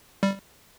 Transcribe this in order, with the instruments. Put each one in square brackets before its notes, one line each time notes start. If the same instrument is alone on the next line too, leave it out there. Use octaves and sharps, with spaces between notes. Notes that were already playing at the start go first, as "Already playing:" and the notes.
[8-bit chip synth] G3